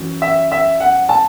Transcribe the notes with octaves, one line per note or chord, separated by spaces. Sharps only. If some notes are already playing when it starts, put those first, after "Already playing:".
Already playing: F#2 E3
E5
E5
F#5
A5